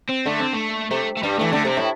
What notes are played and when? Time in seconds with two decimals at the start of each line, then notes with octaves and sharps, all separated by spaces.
0.09 C4
0.26 D3 A3
0.40 C4
0.53 A3
0.91 C3 A3
1.17 A3
1.23 G2 G3
1.39 E3 A3
1.51 D3 A3 C4
1.65 C3 C4
1.77 A2 E4